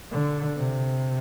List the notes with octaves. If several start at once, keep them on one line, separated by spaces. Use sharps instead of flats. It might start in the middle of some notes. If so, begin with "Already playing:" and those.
D3
C3